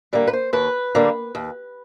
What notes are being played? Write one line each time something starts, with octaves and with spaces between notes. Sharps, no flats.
D3 G3 A#3
B4
C5
D#2 B4
D3 G3 A#3
D#2